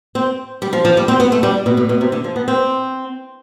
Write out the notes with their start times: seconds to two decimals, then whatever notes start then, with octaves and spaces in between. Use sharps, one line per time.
0.15 C4
0.62 G3
0.73 F3
0.85 F3
0.97 G3
1.08 C4
1.20 B3
1.32 A3
1.43 G3
1.66 B2
1.77 A2
1.89 B2
2.01 C3
2.12 D3
2.24 F3
2.36 B3
2.48 C4